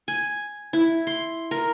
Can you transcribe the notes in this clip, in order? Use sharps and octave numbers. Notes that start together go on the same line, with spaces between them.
G#5
E4
C6
A#4